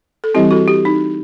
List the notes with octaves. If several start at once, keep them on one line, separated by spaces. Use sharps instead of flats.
A4
E3 G3 C4 E4 G4
F#4 A4
E4 G4
D#4